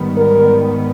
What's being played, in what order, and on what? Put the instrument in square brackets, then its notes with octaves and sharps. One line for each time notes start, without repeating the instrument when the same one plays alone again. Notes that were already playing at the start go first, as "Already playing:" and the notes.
Already playing: [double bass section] G#2 D#3 G3 B3
[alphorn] A#4